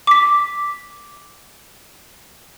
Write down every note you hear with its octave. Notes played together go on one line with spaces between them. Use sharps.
D6 B6